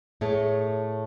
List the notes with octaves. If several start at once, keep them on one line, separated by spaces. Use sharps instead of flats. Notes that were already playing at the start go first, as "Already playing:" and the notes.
A2 A3 G#4 C#5